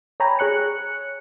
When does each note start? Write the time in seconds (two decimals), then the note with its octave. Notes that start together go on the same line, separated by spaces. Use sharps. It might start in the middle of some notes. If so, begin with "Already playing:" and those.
0.20 C#5 G5 G#5 A#5 B5
0.39 G#4 C#5 F#6 C#7